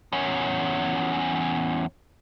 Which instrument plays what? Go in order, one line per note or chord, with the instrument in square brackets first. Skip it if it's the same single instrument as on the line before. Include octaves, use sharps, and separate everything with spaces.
[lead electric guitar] E2 C#4